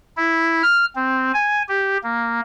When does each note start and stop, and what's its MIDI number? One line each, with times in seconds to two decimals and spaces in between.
0.17 0.62 64
0.63 0.85 89
0.95 1.31 60
1.33 1.62 80
1.68 1.97 67
2.03 2.40 58